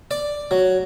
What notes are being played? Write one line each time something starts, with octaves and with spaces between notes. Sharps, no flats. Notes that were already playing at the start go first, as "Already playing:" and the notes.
D5
F#3